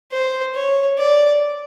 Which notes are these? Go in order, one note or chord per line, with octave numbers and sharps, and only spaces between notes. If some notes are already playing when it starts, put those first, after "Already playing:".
C5
C#5
D5